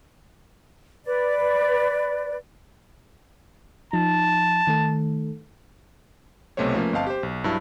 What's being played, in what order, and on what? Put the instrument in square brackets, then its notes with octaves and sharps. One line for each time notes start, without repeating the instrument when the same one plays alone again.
[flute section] B4 D5
[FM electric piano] F3 D#4 [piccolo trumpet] A5
[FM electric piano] D#3 A3 A4
[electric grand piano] B1 C3 A3 B3 C5 C#5
F3 A3 A#3 C#4 B4
G1 C4 D#5 F5 A5
G4 C5
B1
G2 F#3 E4 A5